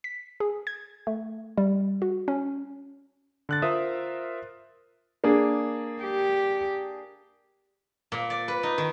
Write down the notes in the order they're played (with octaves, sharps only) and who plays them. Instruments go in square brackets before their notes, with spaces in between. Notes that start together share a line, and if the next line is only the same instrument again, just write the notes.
[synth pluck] B6
G#4
G#6
A3
G3
F#4
C#4
[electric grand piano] D3 F#6 A6
F4 A#4 C5 E5 D#6
[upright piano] A#3 D4 G#4
[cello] G4
[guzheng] A#2
D5
B4
D#4
D#3